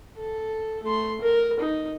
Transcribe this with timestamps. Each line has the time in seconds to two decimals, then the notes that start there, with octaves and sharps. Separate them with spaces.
0.16 A4
0.83 A3 C6
1.21 A#4
1.60 D#4